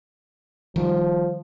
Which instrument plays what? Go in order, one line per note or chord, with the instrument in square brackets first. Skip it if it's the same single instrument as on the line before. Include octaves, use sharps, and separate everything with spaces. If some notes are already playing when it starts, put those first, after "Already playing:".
[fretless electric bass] D#3 G3 [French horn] F3